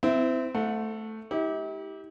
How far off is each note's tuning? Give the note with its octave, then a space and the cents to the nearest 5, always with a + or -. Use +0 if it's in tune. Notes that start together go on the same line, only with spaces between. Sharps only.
C4 -25 E4 +0
A3 +0 F#5 -30
E4 -45 G4 +0